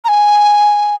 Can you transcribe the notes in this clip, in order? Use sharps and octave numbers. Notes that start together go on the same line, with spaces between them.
A#5
G#5